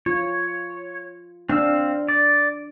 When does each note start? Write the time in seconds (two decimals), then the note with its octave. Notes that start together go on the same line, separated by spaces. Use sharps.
0.06 F4 C#5
1.49 C4 D4 F5 E6
2.09 D5